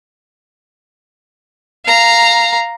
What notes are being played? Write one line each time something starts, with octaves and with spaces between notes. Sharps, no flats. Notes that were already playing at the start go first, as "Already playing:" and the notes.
F5 A#5